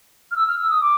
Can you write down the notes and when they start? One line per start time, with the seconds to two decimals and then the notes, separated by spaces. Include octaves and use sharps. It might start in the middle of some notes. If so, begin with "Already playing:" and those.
0.31 F6
0.36 E6
0.47 F6
0.59 E6
0.70 D#6
0.81 D6